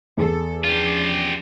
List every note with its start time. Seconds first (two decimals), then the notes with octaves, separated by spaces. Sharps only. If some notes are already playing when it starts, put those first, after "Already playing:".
0.17 E2 A4
0.65 F3 C#4 D4 F4 G4